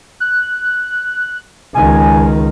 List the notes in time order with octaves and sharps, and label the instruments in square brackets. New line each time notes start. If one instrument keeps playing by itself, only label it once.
[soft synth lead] F#6
[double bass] C#2 D#3 [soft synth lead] G#5